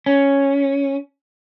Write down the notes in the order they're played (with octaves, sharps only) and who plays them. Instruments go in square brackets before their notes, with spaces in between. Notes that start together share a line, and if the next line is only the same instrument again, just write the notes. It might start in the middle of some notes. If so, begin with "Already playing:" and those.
[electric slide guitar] C#4